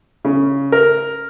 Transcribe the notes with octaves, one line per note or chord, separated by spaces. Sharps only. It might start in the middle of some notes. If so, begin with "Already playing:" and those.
C#3
A#4